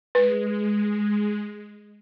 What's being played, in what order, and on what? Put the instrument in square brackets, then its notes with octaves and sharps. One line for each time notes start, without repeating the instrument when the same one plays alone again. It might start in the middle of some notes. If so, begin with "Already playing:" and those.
[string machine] G#3 [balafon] B4